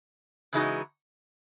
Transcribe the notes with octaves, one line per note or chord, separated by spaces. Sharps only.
C#3 E3 G#3 D#4 F#4